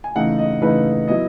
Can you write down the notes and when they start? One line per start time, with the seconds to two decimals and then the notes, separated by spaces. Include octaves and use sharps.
0.04 G#5
0.15 C#3 E3 A3 D#4 F#5
0.38 D#5
0.61 C#3 E3 A3 D#4 B4
1.08 F#3 B3 E4 D#5